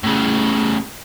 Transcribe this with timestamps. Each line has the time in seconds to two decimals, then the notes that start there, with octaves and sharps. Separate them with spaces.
0.03 A2 C#3